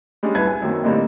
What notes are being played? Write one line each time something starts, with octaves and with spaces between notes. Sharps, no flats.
G3 G#3 C#4 D4
D#1 C2 B4 E5 G#6
G#5
F#2 D#3 A#3 C4
A2 D3 G3 A#3 C4 D#4